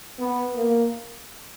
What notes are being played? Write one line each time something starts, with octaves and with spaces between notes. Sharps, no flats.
B3
A#3